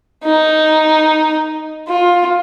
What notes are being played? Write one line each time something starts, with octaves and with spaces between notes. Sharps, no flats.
D#4
F4